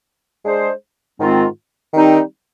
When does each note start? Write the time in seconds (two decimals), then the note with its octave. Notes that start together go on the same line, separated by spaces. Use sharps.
0.44 G#3 D4 G#4 C5
1.20 G#2 D#3 G#3 C4 F4
1.94 D#3 G3 C4 D#4 G4